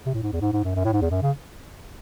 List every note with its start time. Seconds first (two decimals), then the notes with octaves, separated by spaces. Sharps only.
0.06 C3
0.14 A2
0.23 G#2
0.32 E2
0.41 G#2
0.53 G#2
0.64 F#2
0.75 F#2
0.85 A2
0.93 G#2
1.01 E2
1.11 F#2
1.22 C#3